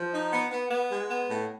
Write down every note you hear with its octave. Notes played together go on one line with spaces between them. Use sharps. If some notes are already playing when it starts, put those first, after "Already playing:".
Already playing: F3
D#4
B3
B3
B3
G#3
B3
A2